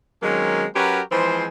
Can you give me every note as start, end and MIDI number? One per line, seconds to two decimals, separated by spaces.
0.23 0.66 51
0.23 0.66 54
0.23 0.66 56
0.23 0.66 58
0.23 0.66 60
0.23 0.66 61
0.76 1.02 54
0.76 1.02 61
0.76 1.02 66
0.76 1.02 67
0.76 1.02 70
0.76 1.02 71
1.12 1.47 52
1.12 1.47 53
1.12 1.47 56
1.12 1.47 60
1.12 1.47 68
1.12 1.47 72